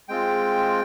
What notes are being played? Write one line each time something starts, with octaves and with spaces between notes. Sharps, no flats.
G#3 C4 F4 G5